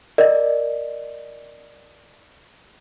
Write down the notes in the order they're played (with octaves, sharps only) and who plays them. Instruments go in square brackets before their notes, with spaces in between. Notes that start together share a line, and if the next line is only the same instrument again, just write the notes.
[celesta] A#4 D5 D#5